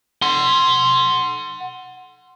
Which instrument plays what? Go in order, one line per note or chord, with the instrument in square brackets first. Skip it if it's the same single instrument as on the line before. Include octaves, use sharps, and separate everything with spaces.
[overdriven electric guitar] F#5 C6